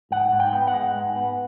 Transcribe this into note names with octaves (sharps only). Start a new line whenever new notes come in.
G#2 F#5
G#2
G5
B3
F#5
G#3
G#2
B3